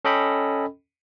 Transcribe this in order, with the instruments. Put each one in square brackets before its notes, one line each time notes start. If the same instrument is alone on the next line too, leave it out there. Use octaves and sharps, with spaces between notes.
[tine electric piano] C#4 A4 D#5 G5 B5